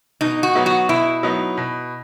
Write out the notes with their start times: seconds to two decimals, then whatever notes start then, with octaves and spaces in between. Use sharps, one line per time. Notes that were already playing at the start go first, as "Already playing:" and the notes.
0.21 B2 D#4
0.43 F#4
0.55 F#3 B3 D#4
0.66 F#4
0.89 B2 E4
1.23 F#3 B3 D#4
1.57 B2